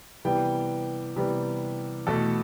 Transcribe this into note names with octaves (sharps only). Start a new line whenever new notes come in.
C3 E3 G3 B3 G5
C3 E3 G3 B3
E2 B2 A3 A4